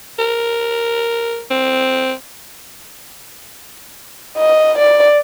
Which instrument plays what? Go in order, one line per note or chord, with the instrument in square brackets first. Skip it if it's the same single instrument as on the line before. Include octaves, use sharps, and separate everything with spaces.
[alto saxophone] A#4
C4
[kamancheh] D#5
D5